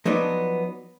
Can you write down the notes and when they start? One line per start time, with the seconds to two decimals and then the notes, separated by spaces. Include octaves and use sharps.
0.05 F3 F#3 B3 D4 D#4